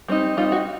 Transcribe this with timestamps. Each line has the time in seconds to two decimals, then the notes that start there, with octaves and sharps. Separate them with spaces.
0.08 G3 C4 D#4
0.37 G3 C4 D#4 F4
0.52 F#4